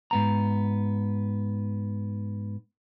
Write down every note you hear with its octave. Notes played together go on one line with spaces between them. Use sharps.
G#2 B3 A#5